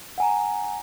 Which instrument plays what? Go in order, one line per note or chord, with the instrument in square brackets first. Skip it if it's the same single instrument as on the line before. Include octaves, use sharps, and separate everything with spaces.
[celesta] F#5 G#5 A#5